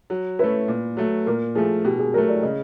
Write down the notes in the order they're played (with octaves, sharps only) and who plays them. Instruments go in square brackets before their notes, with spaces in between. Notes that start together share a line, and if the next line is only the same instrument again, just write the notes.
[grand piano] F#3
[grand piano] A3 C#4 E4 [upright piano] B4
[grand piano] A#2
F#3 A3
[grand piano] A#2 [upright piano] A#4
[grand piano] F3 A3 [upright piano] G#4
[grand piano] B2 [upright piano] G4
[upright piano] G#4
[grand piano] F#3 A3 [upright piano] A#4
[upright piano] D5
[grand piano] C#3 [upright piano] D#5